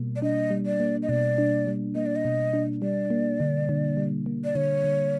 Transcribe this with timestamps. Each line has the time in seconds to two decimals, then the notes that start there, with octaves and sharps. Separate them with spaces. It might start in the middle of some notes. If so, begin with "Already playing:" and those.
Already playing: B2 G3 A#3
0.16 D5
0.22 D4 D#5
0.51 G3
0.66 D5
0.80 A#3
1.03 D#5
1.09 B2 D5
1.38 D4
1.67 G3
1.95 A#3 D#5
2.06 D5
2.16 D#5
2.25 B2
2.53 D4
2.82 G3 D5
3.10 A#3
3.40 D3
3.69 D3
3.97 G3
4.26 A#3
4.44 D5
4.55 D3 C#5
4.84 D3